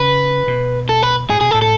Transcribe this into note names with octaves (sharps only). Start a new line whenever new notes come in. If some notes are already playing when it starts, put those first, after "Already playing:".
Already playing: C#3 B4
B2
A4
B4
A2 G#4
B2 G#4
A4
A2
A4